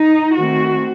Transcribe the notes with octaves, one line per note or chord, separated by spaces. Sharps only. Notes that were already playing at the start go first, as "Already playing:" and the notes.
Already playing: D#4
D#3 A3 C4 F#4